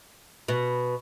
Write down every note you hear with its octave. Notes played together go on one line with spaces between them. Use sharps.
B2